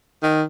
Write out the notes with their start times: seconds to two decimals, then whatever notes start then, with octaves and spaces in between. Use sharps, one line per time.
0.23 D#3